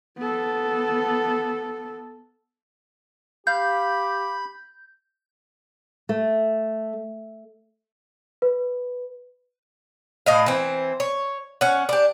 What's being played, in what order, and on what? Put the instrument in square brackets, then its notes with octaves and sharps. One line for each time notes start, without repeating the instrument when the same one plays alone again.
[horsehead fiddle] B3 A4
[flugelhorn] G4 [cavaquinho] F5 [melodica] B5 [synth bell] G6
[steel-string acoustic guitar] A3
[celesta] B4
[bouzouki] A2 D#5 F5
E3 C4
C#5
C#4 F#5
D4 G4